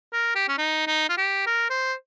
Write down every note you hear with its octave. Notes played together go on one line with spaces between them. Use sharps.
A#4
G4
C#4
D#4
D#4
F4
G4
A#4
C5